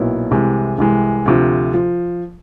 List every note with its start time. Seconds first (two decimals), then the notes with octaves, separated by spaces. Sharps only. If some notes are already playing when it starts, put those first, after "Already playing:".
Already playing: B1 A#2 F#3 B3 E4
0.31 C2 C3 E3 G#3
0.78 C2 C3 E3 G#3
1.26 D2 C3 F3
1.74 F3